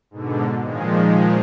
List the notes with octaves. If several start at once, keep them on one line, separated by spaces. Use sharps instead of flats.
G#2 B2 D3
A#2 D#3 F3 G#3